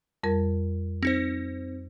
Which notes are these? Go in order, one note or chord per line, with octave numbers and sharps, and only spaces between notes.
F2 G3 A#4
C4 D#4 C5